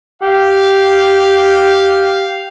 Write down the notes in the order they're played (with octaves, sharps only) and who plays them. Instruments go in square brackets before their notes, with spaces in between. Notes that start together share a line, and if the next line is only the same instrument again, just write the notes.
[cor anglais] G4 [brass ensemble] F5